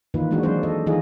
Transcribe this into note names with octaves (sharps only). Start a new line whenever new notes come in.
D#3 E3 A#3 D#4 F4 B4
E3 G#3 A#3 D4 D#4 F#4
F#3 G#3 C4 D4 G#4 C5
A4 D#5
D#3 E3 D#4 F4 G#4 D#5